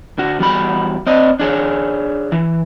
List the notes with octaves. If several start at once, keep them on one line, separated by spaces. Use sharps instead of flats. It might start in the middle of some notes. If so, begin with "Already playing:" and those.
D3 F#4
E2 G3 F#4 B5
C4 D5 D#5
D4 G#4 C#5
E3